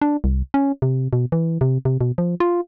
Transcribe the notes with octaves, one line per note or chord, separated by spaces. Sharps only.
D4
C2
C#4
C3
B2
E3
C3
C3
B2
F3
F4